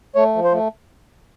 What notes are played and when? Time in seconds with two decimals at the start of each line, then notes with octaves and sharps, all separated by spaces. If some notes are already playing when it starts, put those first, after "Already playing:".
0.15 A3 C#5
0.35 F3
0.44 C5
0.53 A3